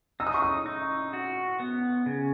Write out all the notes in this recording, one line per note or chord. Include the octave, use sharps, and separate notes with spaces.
D#4 E6
D#6
C#6
D#6
D#4
F#4
B3
C#3